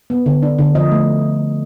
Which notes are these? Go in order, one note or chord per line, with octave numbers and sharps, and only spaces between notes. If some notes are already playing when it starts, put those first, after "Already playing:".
B3
D3
D4
D3
F3 D#5
A3